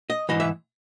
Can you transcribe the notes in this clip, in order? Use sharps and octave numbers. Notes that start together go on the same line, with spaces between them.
D#5
G#2 E3 D#5
E5